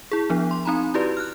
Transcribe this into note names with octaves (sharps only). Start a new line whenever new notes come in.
E4 G#4
F3 B3 D4
C6
C4 D#4 A#5 B5
E4 F#4 G4 B4 D5
F6 F#6